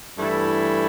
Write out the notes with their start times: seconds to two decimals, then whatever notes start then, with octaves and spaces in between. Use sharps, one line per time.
0.18 G2 E3 A3 E4